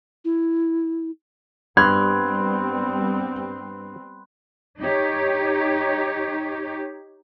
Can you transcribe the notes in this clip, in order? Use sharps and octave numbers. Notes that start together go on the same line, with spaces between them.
E4
G2 G3 B3 C4 B5 C6 F#6 G#6
D#4 G4 C#5